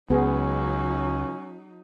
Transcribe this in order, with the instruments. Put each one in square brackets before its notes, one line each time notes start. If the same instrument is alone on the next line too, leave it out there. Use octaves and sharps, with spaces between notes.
[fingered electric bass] C#2 [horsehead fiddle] F#3 D#4 [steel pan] B3 G#4 [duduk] C#4